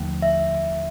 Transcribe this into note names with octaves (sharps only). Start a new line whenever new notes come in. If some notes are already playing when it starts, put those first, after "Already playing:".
Already playing: D#2 D3 F3 A3
E5